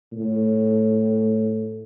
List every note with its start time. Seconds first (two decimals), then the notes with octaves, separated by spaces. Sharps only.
0.12 A2